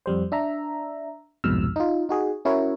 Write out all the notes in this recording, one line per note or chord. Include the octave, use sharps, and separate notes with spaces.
F2 G3 C5
D4 E5 A#5
C2 F2 G#2 B2 E6 F6
D#4 F4
D#4 F#4 G#4
C#4 E4 F#4 A#4 C#5